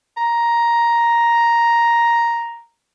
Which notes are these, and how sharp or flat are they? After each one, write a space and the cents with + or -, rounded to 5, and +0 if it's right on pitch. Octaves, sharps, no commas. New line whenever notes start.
A#5 +5